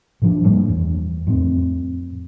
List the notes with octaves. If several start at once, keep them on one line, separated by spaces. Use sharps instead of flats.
A2 F3 D4
F#2 A2 G3 A#3
E2
F2 A2 B3 C4